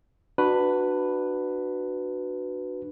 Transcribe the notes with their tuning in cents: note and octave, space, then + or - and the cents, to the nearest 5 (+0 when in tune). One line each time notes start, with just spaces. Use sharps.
D4 +25 F#4 +0 B4 +0